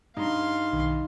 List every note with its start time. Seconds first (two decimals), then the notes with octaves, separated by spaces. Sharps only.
0.17 G2 D#4 F5 C6
0.73 B1 D#3